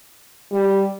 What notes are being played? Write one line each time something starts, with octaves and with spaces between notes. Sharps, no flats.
G3